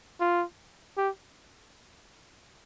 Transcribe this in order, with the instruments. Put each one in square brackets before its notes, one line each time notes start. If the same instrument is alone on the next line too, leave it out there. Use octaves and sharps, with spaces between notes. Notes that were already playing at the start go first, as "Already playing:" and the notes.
[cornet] F4
G4